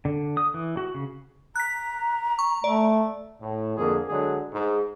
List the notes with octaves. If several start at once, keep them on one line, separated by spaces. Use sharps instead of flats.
D3
D#6
E3
F#4
C#3
A#5 F#6 B6
C#6
A3 D5
A2
F2 D3 A#3 G#4
D3 F#3 G#3 G#4
G#2